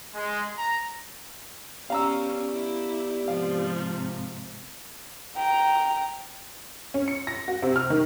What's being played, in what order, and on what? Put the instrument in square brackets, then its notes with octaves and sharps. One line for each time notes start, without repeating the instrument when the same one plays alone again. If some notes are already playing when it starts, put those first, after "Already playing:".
[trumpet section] G#3
A#5
[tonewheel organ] B3 G4 D5 [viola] C#4 [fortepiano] F5 A#5 E6
[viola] E4
[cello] G#2 C3 [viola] F3 [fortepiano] F5
[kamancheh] G5 A#5
[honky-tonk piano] C#4
C#7
A#6
F#4
C3
F6
D#3